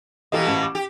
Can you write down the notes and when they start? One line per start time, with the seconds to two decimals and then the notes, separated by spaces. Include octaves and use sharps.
0.32 B2 E3 A#3 G4 A4 D#5
0.46 A1 A5 E7
0.62 D6
0.75 G4